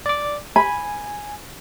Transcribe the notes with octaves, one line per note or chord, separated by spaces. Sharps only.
D5 D6
G#5 B5